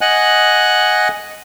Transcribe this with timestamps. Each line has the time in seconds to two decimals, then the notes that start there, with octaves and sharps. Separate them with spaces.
0.01 D#5 F#5 G#5 F#6